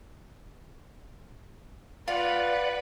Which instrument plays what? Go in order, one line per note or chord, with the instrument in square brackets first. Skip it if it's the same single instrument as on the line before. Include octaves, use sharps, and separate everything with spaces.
[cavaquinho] F4 [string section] B4 [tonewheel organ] D5 F#5